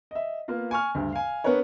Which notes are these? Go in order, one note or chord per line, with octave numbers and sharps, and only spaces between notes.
D#5 E5
A#3 B3 F4
G#5 C#6 F6
D2 G2
F5 G#5
B3 D4 A#4 B4 C#5